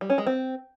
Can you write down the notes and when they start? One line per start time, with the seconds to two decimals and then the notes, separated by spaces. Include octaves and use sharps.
0.01 G3
0.10 C#4
0.18 G#3
0.27 C4